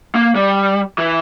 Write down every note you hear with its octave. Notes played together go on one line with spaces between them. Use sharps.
A#3
G3
E3